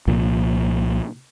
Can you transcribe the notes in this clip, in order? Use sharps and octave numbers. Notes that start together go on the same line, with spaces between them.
C2 A#2 F3